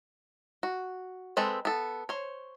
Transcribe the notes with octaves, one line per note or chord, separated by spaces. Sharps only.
F#4
G#3 C4 A4 B4
B3 A4
C5 C#5